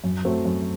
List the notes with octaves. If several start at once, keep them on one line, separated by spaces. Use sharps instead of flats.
F#2
F#3 A3 C4
F#2